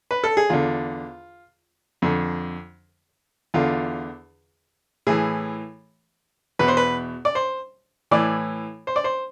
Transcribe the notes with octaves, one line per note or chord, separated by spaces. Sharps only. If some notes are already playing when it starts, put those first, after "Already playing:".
B4
A4
G#4
E2 D3 F4
F2 D3
E2 D3 F4
A2 E3 G#4
E2 B2 B4
C5
B4
D5
C5
A2 E3 D5
C5
D5
C5